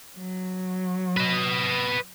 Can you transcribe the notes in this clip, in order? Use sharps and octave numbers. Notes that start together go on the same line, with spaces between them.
F#3
B4 D#5